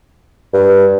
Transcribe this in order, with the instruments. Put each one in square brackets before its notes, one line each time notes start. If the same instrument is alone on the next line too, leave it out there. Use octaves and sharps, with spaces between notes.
[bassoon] G2